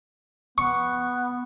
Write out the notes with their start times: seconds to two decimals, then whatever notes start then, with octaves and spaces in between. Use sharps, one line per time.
0.58 B3 C#6